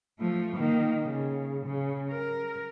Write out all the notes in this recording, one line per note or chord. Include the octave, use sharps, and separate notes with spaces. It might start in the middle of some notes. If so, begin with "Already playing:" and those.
F3 A3
D#3 A#3
C#3
C#3
A#4